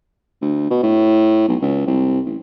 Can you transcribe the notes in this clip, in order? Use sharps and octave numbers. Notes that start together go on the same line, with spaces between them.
D2
B2
A2
B1
C#2
C2
A1